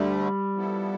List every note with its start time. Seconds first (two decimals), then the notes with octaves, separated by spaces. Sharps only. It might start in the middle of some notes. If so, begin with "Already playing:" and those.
Already playing: D2 D3 G3 A3
0.55 F3 B3 E4 A4